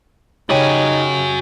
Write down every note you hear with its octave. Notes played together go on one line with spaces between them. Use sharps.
C#3 D#4 F#4 G4 C#5 G#5 B5